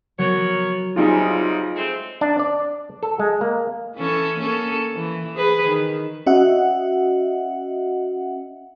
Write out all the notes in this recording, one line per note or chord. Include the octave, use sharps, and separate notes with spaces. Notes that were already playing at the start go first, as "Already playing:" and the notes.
F#3 B3 A#4 C#5
C3 F#3 G3 D#4 F4 G#4
G#3 A3 C4
D4
D5
A4
G#3
A#3
E3 C#4 A4
A#3 C#4 A4
E3
G#4 B4
D#3
C#4 F#4 D#5 E5 F#5